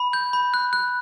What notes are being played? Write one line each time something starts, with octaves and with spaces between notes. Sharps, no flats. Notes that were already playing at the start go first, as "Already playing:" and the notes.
Already playing: B5
G6
B5
F#6
F#6